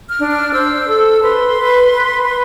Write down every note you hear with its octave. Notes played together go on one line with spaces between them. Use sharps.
F6
D4
F6
C5 E6
A4
B4 C6
B4
B4
B4